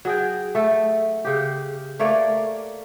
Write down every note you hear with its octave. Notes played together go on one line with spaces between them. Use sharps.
F#3 G#4 G5
A3 A4
C#3 G4
A3 A#3 C#5 D5